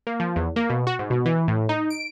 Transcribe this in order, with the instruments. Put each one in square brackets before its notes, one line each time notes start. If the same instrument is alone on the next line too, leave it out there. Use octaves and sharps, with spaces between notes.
[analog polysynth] A#3
F3
E2
A#3
B2
F#4
G#2
B2
E3
A2
D#4
D7